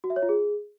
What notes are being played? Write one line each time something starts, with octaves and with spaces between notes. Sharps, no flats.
F#4
E5
C#5
F4
G#4